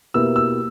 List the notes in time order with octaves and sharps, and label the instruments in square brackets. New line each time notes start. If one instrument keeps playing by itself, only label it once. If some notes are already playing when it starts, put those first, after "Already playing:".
[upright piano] B2 A#3 E4 G4 B4 [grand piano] E6
[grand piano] E6